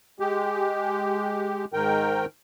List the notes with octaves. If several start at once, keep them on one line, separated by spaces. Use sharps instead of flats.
G#3 G4
G#2 D#3 A#4 G5